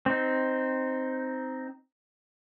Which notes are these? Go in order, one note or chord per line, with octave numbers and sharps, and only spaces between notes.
C4 D#4